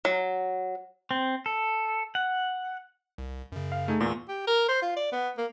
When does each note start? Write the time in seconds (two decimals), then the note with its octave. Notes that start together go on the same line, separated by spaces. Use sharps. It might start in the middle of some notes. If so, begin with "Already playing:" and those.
0.05 F#3
1.11 C4
1.46 A4
2.15 F#5
3.18 C2
3.52 F#2 C#3
3.72 F5
3.88 A3 D#4 G#4
4.00 E2 A#2 C6 C#6
4.29 G4
4.47 A#4
4.69 C5
4.83 F4
4.96 D5
5.13 B3
5.38 A#3